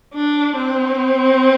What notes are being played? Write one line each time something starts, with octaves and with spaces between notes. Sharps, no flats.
D4
C4